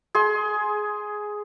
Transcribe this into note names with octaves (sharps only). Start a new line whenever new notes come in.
G#4 C6